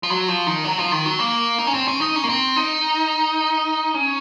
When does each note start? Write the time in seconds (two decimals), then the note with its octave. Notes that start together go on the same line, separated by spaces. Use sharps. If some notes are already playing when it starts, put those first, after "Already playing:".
0.03 F3
0.10 F#3
0.28 F3
0.47 D#3
0.65 F#3
0.79 F3
0.91 D#3
1.05 F#3
1.19 A#3
1.58 D#4
1.67 C#4
1.74 C4
1.88 C#4
2.01 D#4
2.16 C#4
2.24 A#3
2.29 C4
2.56 D#4
3.94 C#4